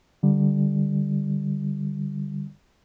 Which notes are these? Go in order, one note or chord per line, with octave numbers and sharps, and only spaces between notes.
D3 G3